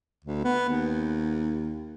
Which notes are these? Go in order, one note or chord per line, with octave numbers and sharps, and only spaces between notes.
D2
B3
D#2